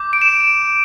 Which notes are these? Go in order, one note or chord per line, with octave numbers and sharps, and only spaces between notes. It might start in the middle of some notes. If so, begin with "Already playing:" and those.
Already playing: D6 G6
D7
E7
D7